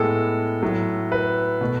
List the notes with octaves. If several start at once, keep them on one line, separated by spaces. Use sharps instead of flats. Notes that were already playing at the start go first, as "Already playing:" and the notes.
Already playing: A2 G#3 B3 A4
A2 F#3 A3
B4
B2 A3